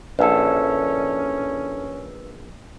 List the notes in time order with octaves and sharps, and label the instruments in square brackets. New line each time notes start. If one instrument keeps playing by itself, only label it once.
[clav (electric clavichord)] A#1 [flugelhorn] C#4 [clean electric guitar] D4 E4 A4 [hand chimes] B4 E6